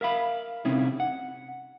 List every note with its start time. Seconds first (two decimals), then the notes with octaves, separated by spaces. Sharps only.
0.01 A#4 E5 F5 B5
0.65 C3 C4 C#4 D#4 E4
1.00 F#5